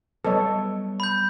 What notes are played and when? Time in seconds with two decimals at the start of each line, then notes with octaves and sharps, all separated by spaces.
0.25 F#3 G3 B3 A4 B4 C#5 D#5 D#6
1.00 B5 G6